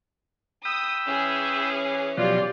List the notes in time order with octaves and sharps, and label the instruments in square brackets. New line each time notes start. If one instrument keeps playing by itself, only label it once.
[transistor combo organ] G5 B5 E6 [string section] D#6
[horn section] E3 C#4 [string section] G#4
[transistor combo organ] B2 F3 F#3 [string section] F4 [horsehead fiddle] G4 D5